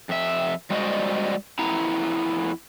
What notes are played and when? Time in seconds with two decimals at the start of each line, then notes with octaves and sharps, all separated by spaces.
0.09 F2 E5
0.70 G3 G#3 F#4 C5 D5 D#5
1.59 F2 B3 E4 A#5